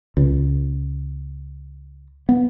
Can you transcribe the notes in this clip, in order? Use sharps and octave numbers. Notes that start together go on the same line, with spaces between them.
C#2
B3